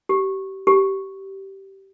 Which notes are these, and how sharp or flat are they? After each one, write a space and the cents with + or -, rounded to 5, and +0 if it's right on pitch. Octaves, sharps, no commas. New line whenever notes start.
G4 -25
G4 -15